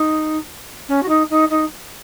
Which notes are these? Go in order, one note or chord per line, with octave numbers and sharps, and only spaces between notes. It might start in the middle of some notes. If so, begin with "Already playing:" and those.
Already playing: D#4
C#4
F#4
D#4
D#4
D#4